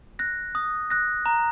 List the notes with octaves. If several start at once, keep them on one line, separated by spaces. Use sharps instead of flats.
F#6 A#6
D#6
F#6 A#6
A#5